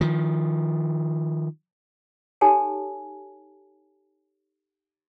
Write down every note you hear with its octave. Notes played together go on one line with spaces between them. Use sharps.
D#3 F3
D#4 G4 A4 C#5 G#5 A5